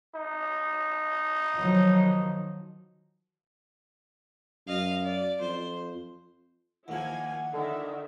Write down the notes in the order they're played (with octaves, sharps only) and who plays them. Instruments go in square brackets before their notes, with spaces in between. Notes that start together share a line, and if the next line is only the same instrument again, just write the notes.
[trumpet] D#4
[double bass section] D#3 F3 F#3
[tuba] F#2 [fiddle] D#5 F5
[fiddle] D5
[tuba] F2 [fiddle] C5
[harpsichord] D#2 F3 [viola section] A#3 E4 G#5 [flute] F#5
[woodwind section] D3 [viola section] D#3 E5